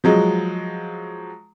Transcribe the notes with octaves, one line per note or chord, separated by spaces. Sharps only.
F3 F#3 G#3